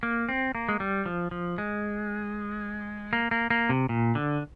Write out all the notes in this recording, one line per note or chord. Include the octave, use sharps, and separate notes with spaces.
A#3
C4
A#3
G#3
G3
F3
F3
G#3
A#3
A#3
A#3
C3
A#2
D3